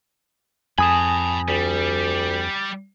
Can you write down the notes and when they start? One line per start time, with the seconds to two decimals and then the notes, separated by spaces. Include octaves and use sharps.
0.78 F2 G#5 A5 B5 D#6
1.48 D2 G3